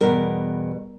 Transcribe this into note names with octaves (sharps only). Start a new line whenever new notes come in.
E2 B2 G3 A#4